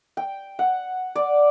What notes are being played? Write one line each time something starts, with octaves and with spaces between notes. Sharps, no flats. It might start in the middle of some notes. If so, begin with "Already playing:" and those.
G5
F#5
D5